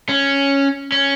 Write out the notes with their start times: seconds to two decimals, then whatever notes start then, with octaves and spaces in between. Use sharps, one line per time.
0.09 C#4
0.92 C#4